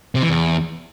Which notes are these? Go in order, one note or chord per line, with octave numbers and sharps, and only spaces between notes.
C3
E3
E2